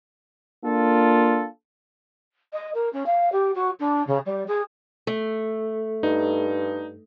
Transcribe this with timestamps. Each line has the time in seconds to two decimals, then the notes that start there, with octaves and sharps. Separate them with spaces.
0.65 A#3 D4 F4 A4
2.53 D#5
2.74 A#4
2.93 C#4
3.06 F5
3.32 G4
3.55 F#4
3.80 D4
4.07 C#3
4.26 G3
4.48 G#4
5.07 A3
6.03 G2 D#4